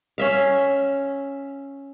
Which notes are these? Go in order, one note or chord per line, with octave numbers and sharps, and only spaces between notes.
C#4 E5 F5